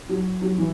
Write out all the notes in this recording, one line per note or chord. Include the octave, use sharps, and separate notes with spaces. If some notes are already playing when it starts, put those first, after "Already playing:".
F#3
F#3
E3